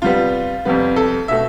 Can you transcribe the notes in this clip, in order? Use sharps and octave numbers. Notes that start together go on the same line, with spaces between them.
C3 G3 B3 F4
F2 C3 G3 B3
A4
B2 A3 E5